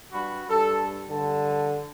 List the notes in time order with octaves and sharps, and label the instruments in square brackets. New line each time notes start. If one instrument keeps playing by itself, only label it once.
[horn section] G2 F#4 B5
[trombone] G2 [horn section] A4
[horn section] G2 A5 [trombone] D3